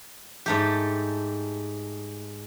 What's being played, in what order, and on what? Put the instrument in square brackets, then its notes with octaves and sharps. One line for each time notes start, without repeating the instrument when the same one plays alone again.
[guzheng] G#2 A3 G4